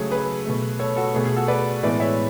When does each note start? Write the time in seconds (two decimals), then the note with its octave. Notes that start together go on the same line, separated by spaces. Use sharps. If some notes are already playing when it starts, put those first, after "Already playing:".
Already playing: C#3 F#3 A3 G#4 A4 C#5
0.10 G#4 B4
0.46 B2 A3
0.79 A4 C#5
0.96 F#4 A4
1.14 B2 A3 G#4
1.26 G#4
1.36 F#4 A4
1.48 B4 D5
1.83 A2 E3 G#3 B3 B4 D5
2.00 C#5 E5